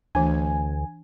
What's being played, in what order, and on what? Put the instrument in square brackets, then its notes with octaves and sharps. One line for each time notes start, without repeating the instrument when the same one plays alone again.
[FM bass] D2 [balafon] E3 D4 [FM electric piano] G#5